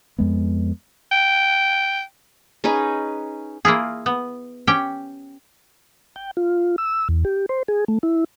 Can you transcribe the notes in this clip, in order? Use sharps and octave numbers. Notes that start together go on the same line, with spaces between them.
F2 G#3 B3
G5
C#4 D#4 G#4 B4
A#3 E4 F4 G#4
B3
C#4 G4 G5
G5
F4
E6
E2
G4
C5
G#4
A3
E4